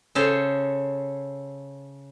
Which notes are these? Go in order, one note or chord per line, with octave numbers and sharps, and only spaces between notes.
C#3 A4 C5 C#5